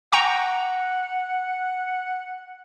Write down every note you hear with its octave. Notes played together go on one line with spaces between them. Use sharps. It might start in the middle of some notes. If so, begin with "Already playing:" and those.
F#5 G5 A#5 C#6